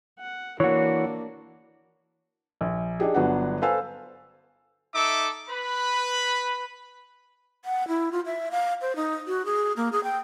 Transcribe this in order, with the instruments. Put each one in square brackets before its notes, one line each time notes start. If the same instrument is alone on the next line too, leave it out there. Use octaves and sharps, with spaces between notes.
[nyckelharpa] F#5
[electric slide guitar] E3 F#4 [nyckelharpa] A#3 D4 [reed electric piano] C#5
[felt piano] A#1
D4 D#4 G4 G#4
G1 F#3 B3 D4 F#5
A4 B4 C5 F5 G#5 E6
[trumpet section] D#4 A4 E5 D6
B4 B5
[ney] F#5
E4
F4
E5
F5
C5
D#4
F#4
G#4
A#3
G#4
G5